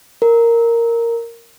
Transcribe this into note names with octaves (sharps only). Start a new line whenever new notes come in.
A#4